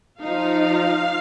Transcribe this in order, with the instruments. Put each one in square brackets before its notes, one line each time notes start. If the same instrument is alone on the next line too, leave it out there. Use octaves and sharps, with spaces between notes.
[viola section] F3 D#4 F5